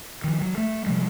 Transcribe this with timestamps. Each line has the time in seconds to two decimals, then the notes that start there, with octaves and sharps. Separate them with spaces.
0.24 D#3 F3
0.42 F#3
0.58 A3
0.87 C3 F3 G3 G#3